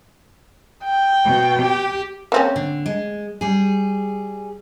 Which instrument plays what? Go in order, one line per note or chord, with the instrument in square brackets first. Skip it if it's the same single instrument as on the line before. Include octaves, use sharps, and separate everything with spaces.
[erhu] G5
[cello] B2
G4
[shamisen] A#3 C4 C#4
[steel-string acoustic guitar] D3
G#3
G3 G#4